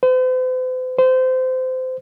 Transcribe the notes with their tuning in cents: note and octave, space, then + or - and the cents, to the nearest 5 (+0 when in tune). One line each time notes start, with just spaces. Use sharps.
C5 -45
C5 -25